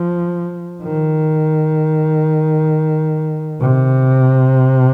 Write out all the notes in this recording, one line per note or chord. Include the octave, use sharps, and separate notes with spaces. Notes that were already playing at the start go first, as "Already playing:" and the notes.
Already playing: F3
D#3
C3